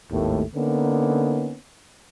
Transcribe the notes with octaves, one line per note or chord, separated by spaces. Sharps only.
G#1 D#2 A2 A3
D3 A#3 B3 C#4 D#4